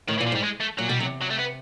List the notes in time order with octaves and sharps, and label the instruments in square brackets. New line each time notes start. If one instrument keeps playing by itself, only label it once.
[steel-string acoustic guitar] A2 [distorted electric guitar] D#3
[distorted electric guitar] E3
[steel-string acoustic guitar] A#2
[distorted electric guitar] F3
[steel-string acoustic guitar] G#2 [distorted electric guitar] G3
[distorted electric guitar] G#3
A3
[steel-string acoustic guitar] A#2 [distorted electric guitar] F#3
[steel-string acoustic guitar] B2 [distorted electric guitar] G3
[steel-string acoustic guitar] C3 [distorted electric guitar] F#3
[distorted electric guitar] F#3
A3
B3